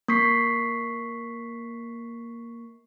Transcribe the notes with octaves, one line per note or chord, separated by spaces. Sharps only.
A#3 C#6 B6 C7